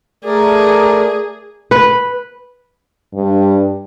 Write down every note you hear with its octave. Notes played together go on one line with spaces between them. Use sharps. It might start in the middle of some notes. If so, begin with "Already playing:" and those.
A3 G#4 A#4 D5
B4
G2